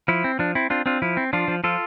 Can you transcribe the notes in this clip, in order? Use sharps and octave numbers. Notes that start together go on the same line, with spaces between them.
F3 E4
C4
F3 D4
C4 E4
C4 D4 F4
C4 D4 F4
F3 E4
C4
F3 D4 F4
F3
F3 F4 A4